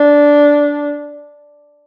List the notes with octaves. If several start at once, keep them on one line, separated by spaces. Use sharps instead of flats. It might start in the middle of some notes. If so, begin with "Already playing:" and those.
Already playing: D4